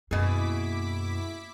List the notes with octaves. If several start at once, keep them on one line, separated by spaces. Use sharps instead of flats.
F#2 B2 A#3 E4 G#4 D6 B6